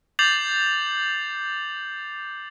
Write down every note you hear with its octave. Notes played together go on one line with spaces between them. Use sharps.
D6 G6 A6 C7 F7 F#7